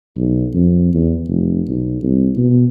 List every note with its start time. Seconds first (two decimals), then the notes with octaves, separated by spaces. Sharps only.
0.17 B1
0.54 F2
0.94 E2
1.28 F1
1.68 B1
2.02 C2
2.37 B2